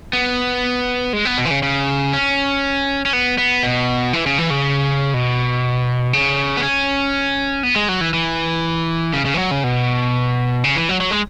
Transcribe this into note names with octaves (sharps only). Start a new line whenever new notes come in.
B3
G#3
B3
B2
E3
C#3
C#3
C#4
C#4
B3
B3
B2
E3
C#3
E3
C#3
B2
C#3
B3
C#4
B3
G#3
F#3
E3
E3
C#3
C#3
E3
F#3
C#3
B2
C#3
E3
F#3
F#3
G#3